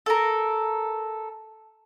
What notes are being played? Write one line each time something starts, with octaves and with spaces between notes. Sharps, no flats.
A4 A#4